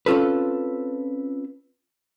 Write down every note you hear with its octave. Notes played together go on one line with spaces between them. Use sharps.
C4 C#4 F4 A4 B4